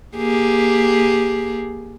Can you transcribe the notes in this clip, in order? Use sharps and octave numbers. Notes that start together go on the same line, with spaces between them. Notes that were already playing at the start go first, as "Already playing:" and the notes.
A#3 G4 G#4